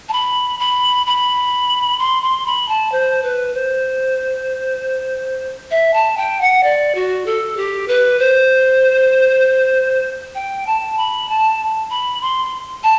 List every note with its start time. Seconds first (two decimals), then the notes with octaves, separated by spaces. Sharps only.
0.09 A5
0.13 B5
0.59 B5
1.07 B5
1.99 C6
2.22 C6
2.46 B5
2.69 A5
2.92 C5
3.23 B4
3.54 C5
5.71 E5
5.93 A5
6.17 G5
6.41 F#5
6.63 D5
6.95 F#4
7.26 A4
7.57 G4
7.88 B4
8.19 C5
10.35 G5
10.67 A5
10.97 B5
11.29 A5
11.90 B5
12.21 C6
12.83 A5